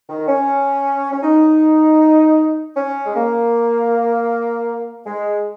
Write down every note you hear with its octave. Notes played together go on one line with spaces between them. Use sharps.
D#3
C#4
C#4
D#4
C#4
G#3
A#3
G#3